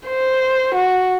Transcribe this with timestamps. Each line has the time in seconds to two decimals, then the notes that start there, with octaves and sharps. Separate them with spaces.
0.08 C5
0.74 F#4